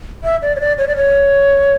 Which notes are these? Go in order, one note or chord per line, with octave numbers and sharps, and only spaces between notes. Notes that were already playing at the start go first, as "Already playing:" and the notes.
E5
D5
C#5
D5
C#5
D5
C#5